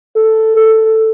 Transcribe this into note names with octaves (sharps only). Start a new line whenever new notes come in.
A4
A4